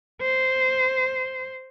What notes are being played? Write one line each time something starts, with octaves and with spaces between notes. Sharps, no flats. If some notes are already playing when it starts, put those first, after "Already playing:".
C5